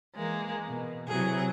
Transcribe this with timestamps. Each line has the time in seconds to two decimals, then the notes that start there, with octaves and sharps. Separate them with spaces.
0.16 E3 G#3 A#3
0.67 B2
1.08 C3 E3 F#3 G#4